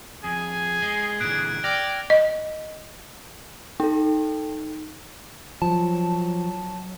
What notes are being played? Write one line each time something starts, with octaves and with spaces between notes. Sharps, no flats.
F2 G#4 G#5
G#3
A#2 D3 E3 F#6 G#6 D7
D5 G5 F6 A#6 F7
D#5
D#4 A4 G5
F3 F#3 A5